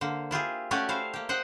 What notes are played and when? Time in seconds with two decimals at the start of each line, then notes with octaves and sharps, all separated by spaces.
0.01 D3 A#3 C5
0.31 E4 F4 G4 G#4
0.71 A3 C#4 F#4 G4 D5 G#5
0.89 E4 C5 F5
1.14 A#3 G4
1.29 C5 D#5 F#5 G5